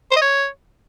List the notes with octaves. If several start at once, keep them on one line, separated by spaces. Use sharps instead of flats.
C5
D#5
C#5